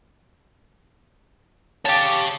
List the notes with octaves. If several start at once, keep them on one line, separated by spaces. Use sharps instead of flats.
G4 C#5 F5 A5